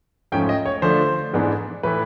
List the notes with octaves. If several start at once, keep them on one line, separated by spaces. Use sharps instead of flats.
G#2 F3 A3 C#4 G5
D#5
C#5
D3 F3 A3 D4 C5
G#2 E3 G#3 B3 D4
A2 E3 A3 B4